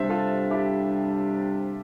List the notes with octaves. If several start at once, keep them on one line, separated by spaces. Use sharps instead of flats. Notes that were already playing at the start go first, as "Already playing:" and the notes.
Already playing: C3 G3 D4 C5 E5
F4 A4
E4 G4